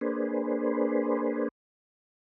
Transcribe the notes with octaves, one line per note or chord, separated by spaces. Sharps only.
A#3 D4 G#4 B4 C5